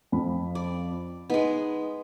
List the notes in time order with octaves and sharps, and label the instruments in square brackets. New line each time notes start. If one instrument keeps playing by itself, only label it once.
[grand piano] F2 F3 B5
[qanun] D5
[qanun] G#3 B3 [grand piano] D#4